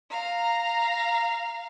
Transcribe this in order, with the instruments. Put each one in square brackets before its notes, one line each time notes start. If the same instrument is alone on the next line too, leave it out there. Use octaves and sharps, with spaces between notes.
[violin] F5 [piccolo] A#5